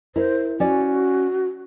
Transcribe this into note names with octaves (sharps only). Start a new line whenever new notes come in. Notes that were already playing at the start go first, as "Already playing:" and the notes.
E4 A#4 C5
C#4 F#4 D5